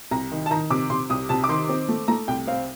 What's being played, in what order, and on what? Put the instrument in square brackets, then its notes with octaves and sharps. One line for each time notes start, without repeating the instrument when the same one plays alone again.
[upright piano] C2 A#5
D#3
A5
D#3 A#5
C3 D6
C3 C6
C2 D#6
C3 A5
D6
D#3 C6
C4
A3
A3 A#5
C2 G5
C4 F5